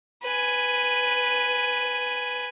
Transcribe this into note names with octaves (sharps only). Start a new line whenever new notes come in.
B4 G#5